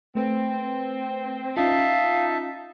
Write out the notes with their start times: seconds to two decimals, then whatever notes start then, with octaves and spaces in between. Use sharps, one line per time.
0.15 A3 C4 B4
1.57 C#4 D#4 F4 E5 F5 A5